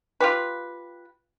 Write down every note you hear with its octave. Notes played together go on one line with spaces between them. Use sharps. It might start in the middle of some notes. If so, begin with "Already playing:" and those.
F4 G4 B4